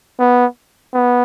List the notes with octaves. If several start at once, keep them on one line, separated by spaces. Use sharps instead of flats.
B3
B3